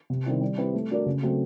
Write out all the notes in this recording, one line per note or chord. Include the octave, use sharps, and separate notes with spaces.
C3
D#3 G3 C4 E4
G3
C4 E4 G4 B4
A3
D4 F#4 A#4 D5
C#3
F#3 A3 C4